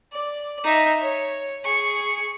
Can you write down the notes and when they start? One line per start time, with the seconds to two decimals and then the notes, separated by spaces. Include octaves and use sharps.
0.13 D5
0.64 D#4 E5
1.01 C#5
1.64 G#4 C#6